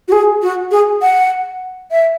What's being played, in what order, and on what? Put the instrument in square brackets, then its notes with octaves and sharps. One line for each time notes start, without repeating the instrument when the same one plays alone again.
[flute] F#4
G#4
F#4
G#4
F#5
E5